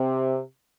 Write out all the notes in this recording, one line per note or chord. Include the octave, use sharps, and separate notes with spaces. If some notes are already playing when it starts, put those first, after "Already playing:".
Already playing: C3